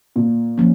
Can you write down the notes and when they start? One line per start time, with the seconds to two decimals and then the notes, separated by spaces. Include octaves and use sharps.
0.16 A#2
0.58 F3 A#3 C#4